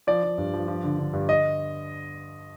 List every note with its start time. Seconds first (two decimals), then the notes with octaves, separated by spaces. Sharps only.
0.07 F3 D5
0.23 F3
0.38 G2
0.54 F3
0.68 F3
0.84 D3
0.99 D3
1.13 G2
1.29 D#5